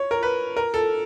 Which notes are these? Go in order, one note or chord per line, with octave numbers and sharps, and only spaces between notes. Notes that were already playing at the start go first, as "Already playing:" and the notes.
Already playing: C#5
A#4
B4
A#4
A4